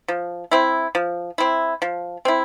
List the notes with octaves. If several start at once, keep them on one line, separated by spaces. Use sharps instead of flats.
F3
C4 E4
F3
C4 E4
F3
C4 E4